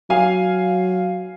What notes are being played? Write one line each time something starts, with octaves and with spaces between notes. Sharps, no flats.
F#3 F5 G#5